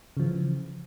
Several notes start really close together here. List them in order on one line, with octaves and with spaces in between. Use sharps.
C#3 F3 E3